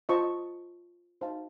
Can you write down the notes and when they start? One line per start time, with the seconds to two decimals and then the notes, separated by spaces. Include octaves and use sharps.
0.09 F4 C5 D#5 A5 C#6
1.21 D#4 F#4 C5 F5 A5